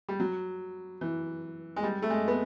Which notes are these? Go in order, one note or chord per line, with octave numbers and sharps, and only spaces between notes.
G3
F#3
E3
G#3
G3
A3
G#3
B3